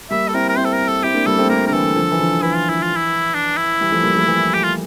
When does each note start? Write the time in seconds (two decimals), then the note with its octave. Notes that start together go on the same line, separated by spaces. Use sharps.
0.11 G3 A#3 E5
0.28 A4
0.34 C4 E4 A#4
0.49 A#4
0.57 C4 E4 C5
0.65 A4
0.73 A#4
0.88 A4
1.03 C4 E4 G4
1.14 A#3 D4
1.26 G3 A#3 A4
1.38 A3 C4
1.50 G3 A#3 A#4
1.67 D3 A#4
1.72 E3 A4
1.95 D3 F3
2.11 E3
2.19 D3 F3
2.35 D3
2.42 E3 E4
2.55 F4
2.69 E4
2.83 F4
2.96 E4
3.34 D4
3.57 E4
3.81 E3 G3
3.92 F3 A3
4.03 G3 A#3
4.15 F3 A3
4.27 E3 G3
4.54 G4
4.63 F4